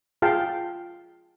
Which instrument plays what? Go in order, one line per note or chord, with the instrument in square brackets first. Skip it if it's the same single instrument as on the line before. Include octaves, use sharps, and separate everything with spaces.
[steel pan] F4 G#4 F5 G5 A5